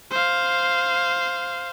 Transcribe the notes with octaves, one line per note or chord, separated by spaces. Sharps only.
C5 F5